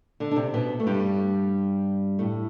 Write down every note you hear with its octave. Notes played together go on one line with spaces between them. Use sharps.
D3 D4
D4
C3 C4
B2 B3
A3
G2 G3
A2 A3